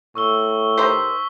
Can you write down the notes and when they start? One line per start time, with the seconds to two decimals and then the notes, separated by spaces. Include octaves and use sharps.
0.15 A2 C#6 E6 G7
0.78 D#3 G4 C5 B6